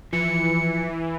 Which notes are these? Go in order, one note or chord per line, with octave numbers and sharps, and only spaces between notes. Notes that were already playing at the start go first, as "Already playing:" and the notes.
E3 F3 C#7